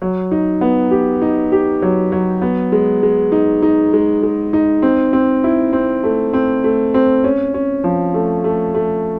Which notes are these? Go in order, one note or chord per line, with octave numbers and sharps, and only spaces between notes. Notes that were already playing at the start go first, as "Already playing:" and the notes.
F#3
D#4
B3
G4
D#4
G4
F#3
F#3
B3
G#3
G#3
D#4
D#4
G#3
G#3
D#4
C4
C4
E4
C4
A3
C4
A3
C4
C#4
C#4
F3
A3
A3
A3